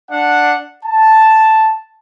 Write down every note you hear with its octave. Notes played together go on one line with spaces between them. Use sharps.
D4 F#5
A5